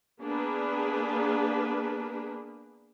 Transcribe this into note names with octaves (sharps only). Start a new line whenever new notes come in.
A#3 B3 D4 G#4 B4